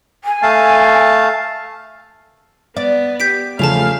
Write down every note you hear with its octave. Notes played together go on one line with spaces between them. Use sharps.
G#5
A3 F5 A5
B3 D5
G4 G6 B6 D7
E2 C#3 F3 A3 G#4 F5 A5 F7